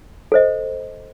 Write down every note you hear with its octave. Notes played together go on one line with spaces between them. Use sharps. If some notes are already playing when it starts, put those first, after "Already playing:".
A4 C5 D#5